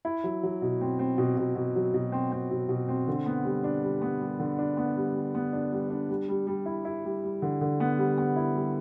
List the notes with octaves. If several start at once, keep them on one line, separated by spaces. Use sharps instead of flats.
E4
F#3
F#3
B2
C4
C4
B2
B2
B2
F#3
B2
C4
C4
B2
B2
C4
D3
B3
G3
D4
G3
B3
G3
D3
D4
B3
G3
G3
B3
D4
G3
D4
G3
G3
G3
E4
E4
G3
G3
D3
D3
B3
G3
B3
E4
G3